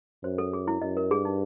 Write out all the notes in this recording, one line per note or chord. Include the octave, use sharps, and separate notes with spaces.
F#2 C5
A4
G#4
E4
F#2 D#5
A#4
G2 G#4
D#4